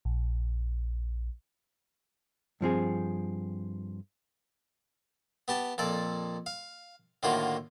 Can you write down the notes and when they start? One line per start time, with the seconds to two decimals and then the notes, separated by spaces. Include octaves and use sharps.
0.05 A#1
2.61 G2 F3 C4 G#4
5.48 B3 G4 A5
5.78 F2 A#2 A4 D5
6.46 F5
7.23 A2 D3 D#3 A#3 F4 F#4